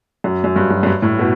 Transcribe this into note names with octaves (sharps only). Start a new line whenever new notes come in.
F#2
F#2
G2
F#2
F#2
G2
A2
B2